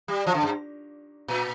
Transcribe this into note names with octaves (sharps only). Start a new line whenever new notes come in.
G3
F3
D3
G2
A#2